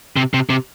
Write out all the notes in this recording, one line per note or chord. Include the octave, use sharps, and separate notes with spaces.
C3
C3
C3